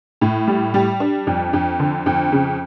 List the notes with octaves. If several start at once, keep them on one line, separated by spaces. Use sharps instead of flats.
A2
G3
G3
D4
F2
F2
D3
F2
C#3